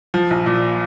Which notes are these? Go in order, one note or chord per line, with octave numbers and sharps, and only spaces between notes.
F3
A#1
A#2